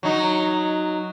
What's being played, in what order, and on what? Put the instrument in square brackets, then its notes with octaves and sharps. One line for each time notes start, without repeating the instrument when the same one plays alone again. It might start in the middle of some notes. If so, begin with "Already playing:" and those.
[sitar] F#3 D#4